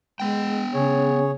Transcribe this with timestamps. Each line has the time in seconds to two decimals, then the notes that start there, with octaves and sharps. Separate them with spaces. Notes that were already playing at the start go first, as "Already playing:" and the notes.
0.20 G#3 B3 G5
0.74 C#3 G#4 C#5